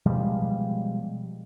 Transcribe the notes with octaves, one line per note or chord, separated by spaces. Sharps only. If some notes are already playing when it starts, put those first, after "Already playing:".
B2 F3 G3 G#3